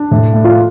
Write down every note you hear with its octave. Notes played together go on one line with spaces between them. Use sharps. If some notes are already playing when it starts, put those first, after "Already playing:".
Already playing: D4
A2
A3
F4